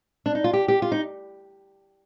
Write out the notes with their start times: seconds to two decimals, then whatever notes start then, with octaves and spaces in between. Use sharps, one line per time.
0.26 D4
0.35 D#4
0.44 F4
0.53 G4
0.68 G4
0.82 F4
0.92 D#4